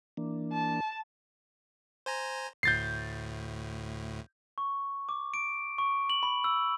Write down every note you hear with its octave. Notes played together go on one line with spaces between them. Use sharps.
E3 A#3 D4
A5
C5 G#5 A#5
D2 A2 G6 A6 C7
C#6
D6
D7
C#6
F#7
B5
E6